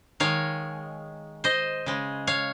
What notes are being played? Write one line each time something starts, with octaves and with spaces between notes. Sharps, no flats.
D#3 G#3 C#5 F5
C5 D#5
C#3 G#3
C#5 F5